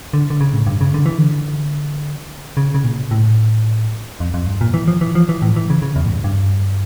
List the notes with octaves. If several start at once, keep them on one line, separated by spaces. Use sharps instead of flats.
D3
D3
C#3
A2
G2
C#3
D3
E3
D3
C#3
C#3
A#2
A2
F2
F2
G2
A#2
E3
F3
E3
F3
E3
A2
E3
C#3
C#3
E2
A2
G2
G2